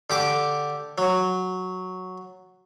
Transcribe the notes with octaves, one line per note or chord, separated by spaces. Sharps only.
D3 G4 D6
F#3